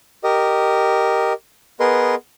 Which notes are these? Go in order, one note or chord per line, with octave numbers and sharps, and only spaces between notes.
G4 A#4 D#5
B3 G#4 A#4 B4 D#5 C6